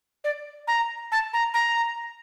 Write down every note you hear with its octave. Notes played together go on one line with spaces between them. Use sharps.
D5
A#5
A5
A#5
A#5